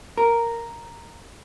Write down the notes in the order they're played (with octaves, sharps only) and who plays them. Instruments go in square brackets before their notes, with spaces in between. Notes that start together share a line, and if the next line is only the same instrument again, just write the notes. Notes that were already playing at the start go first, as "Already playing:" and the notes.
[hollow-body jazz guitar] A#4